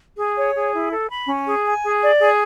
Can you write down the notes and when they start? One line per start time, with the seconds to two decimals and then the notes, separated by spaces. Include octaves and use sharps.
0.17 G#4
0.36 C#5
0.55 G#4
0.73 E4
0.91 A4
1.09 B5
1.27 C#4
1.46 G#4
1.65 G#5
1.84 G#4
2.01 D5
2.19 G#4